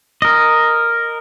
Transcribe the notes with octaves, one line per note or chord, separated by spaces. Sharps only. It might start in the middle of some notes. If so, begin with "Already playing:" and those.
A#4 D#5